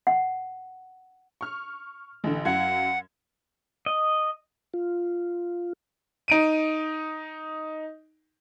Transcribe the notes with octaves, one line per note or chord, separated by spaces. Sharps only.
F#5
C#6 F6
A1 D3
F#2 F5 F#5 G#6
D#5
F4
D#4 D7 D#7